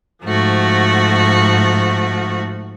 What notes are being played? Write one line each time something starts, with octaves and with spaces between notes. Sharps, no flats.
G#2 F3 A3 F#4